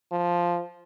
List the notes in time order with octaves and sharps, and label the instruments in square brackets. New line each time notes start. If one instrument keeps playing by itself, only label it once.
[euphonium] F3